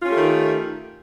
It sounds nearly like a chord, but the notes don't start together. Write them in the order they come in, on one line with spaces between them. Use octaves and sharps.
F4 C#4 G4 A3 D#3